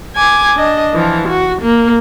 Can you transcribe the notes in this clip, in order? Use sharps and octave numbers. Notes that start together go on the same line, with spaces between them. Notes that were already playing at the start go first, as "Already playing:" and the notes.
G#5 D6
D4 D#5
E3 F3
F#4
A#3